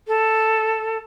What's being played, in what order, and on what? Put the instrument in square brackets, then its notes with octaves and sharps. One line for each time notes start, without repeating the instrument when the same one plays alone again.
[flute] A4